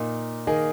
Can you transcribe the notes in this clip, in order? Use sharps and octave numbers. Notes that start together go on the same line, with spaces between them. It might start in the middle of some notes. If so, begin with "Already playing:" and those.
Already playing: A#2 A#3 D#4
D#3 A#3 G#4 D#5